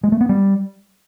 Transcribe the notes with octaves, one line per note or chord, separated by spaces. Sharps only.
G#3
A3
B3
G3